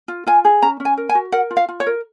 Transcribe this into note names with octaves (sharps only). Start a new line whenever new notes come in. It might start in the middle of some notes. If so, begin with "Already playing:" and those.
F4
F4 G#5
G#4
C#4 A#5
C#4
G#5
A#4
G#5
F#4
A#4 F#5
F4
F5
F4
C#5
A#4